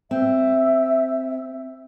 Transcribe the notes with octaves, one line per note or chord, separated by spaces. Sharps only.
C4 E5